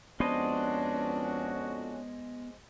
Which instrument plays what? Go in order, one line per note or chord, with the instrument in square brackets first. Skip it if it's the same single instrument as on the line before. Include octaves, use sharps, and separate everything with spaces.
[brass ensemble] F2 C#4 F#4 [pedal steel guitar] G#3 C5 D#5 [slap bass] B3 [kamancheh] D4